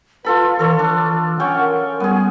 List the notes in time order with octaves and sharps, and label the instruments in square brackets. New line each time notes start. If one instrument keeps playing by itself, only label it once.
[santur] F4 A4 B5 [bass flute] B4
[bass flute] E3 [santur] A4 C#5
[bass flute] E3 [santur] D4
[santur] C#4 G5 C#6 [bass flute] F#5
[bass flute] A#4
[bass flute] G3 [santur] B3 G#4